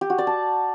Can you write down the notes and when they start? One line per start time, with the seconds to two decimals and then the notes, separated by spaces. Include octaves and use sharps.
0.01 G4
0.10 F#4
0.18 D5
0.27 A5